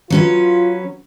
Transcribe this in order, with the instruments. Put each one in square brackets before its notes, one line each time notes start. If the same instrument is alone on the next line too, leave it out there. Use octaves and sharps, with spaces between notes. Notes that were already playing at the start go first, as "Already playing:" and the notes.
[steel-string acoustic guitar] F#3 C#4 B4 [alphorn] F4